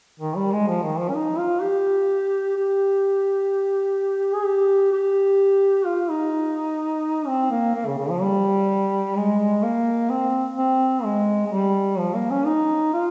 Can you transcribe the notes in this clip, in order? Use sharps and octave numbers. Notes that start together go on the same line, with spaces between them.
D#3
G3
G#3
F3
D#3
F3
C#4
D#4
F4
G4
G4
G#4
G4
G4
F4
D#4
C4
A#3
A#3
C#3
C#3
F3
G3
G#3
A#3
C4
C4
G#3
G#3
G3
F3
A#3
C#4
D#4
F4